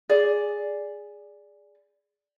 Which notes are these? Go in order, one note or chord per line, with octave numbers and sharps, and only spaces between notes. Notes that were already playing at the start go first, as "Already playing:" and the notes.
G#4 D5